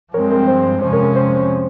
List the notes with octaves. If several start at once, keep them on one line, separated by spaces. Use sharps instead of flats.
G2 F3 G#3 C4 A#4 C#5
A#4
C5
F2 C3 F3 G#3 C#4 C5
A#4 C#5
A#4
C5